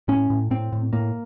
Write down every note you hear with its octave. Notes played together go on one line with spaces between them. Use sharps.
A2 C#4
A2
A2 C4
A2
A2 A#3